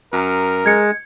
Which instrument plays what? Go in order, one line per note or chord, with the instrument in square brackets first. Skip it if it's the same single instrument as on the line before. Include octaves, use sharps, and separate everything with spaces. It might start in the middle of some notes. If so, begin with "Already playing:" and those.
[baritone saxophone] F#2 [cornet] A#4
[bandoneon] G#3 [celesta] G#6 C#7